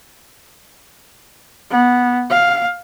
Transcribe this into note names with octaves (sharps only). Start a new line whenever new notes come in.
B3
F5